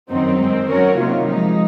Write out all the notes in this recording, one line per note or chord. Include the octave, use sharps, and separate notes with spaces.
F#2 D#3 F#3 C4 D#4
F#2 D#3 G#3 C4
F#3 C#4 F#4 A#4 C#5
C3 D#3 F#3 A#3 F4
F3 G#3 D#4